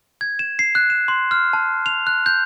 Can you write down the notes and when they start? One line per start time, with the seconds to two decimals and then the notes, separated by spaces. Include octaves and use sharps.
0.21 G#6
0.39 E7
0.59 C7
0.75 F#6
0.90 E7
1.08 C6
1.31 F6
1.53 A5
1.86 F7
2.07 F#6
2.26 G6